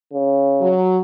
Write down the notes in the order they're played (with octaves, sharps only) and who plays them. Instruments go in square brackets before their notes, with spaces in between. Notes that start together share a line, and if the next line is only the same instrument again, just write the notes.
[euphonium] C#3
[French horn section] F#3